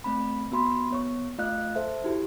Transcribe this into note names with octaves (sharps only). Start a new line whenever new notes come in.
A3 C4 B5
B3 F#4 B5 C6
B3 C#5 C#6
A3 F4 D#5 F5 F#6
A4 C5 E5
E4 F#4 G4